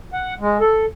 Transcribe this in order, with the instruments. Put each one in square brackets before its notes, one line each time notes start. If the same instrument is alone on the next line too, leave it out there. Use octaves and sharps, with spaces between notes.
[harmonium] F#5
G#3
A4